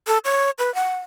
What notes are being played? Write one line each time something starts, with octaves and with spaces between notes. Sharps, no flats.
A4
C#5
B4
F#5